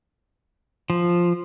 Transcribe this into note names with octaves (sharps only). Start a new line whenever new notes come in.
F3